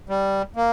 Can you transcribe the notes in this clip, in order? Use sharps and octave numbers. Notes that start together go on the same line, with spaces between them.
G3
A#3